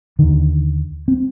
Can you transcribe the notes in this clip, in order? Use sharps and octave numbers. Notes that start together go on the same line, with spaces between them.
D#2 D3 D#3
C4